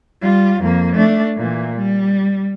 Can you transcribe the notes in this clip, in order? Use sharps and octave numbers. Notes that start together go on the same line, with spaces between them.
G3 F4
F2 A#3
A3 D4
A#2 E3
G3